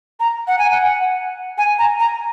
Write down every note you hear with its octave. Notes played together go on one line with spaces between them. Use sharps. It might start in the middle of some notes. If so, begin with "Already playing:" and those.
A#5
F#5
G#5
F#5
G#5
A#5
A#5